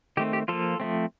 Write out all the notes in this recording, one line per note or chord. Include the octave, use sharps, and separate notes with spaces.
D#3 A3 C4 G4
G4
F3 A#3 F4 A4
F3 A3 C4